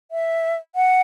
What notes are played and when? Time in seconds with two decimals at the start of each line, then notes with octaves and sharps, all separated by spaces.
0.11 E5
0.75 F#5